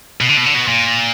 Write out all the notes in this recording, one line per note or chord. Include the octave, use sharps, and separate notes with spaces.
B2
D3
B2
D3
B2
A#2